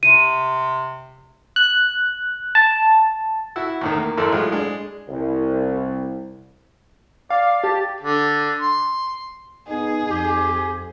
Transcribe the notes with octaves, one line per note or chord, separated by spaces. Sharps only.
C3 D#7
F#6
A5
E4 F#4 E6
E2 A2 D#3
A#3
A1 F#2 E3 A4 A#4 C6
A2 F#3 G#3 E4 F4
G#3 D4
C2
D5 F5
G4 A5
D3
C6
B3 D#4 G#4
F2 G4